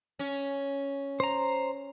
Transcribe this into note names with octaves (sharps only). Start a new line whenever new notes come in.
C#4
C5 A#5